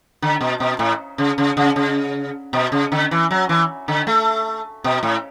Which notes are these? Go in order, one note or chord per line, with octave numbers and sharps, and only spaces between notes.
D3
B2
B2
A2
C#3
C#3
C#3
C#3
B2
C#3
D3
E3
F#3
E3
D3
A3
B2
A2